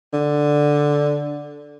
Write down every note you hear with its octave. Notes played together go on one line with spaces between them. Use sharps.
D3